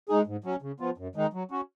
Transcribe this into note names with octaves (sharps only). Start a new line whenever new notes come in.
G#3 D#4 G#4
G#2
F#3 C#4
C#3
F3 B3 F4
F#2
D#3 G#3 D#4
F#3
C#4 F#4